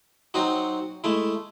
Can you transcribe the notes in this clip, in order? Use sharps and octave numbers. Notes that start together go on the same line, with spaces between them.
F#3 C4 D#4 F#4
G#3 A3 E4